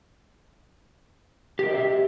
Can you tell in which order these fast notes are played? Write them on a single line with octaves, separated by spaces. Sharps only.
G4 A#4 D#5 C5 E5